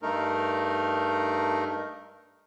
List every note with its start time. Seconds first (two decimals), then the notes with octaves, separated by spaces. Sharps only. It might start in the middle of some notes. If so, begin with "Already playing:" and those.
0.02 G2 A3 D#4 A#4